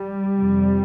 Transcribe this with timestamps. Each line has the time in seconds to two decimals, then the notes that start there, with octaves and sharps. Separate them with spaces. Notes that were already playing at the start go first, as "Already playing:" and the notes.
Already playing: G3
0.36 F2 C3